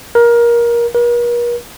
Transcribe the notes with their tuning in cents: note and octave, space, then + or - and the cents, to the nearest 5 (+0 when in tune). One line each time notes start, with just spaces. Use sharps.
A#4 +20
A#4 +45